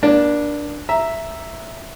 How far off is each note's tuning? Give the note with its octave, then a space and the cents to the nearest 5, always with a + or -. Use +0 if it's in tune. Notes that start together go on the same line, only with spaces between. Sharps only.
A#3 +40 D4 +0
E5 +0 A#5 +0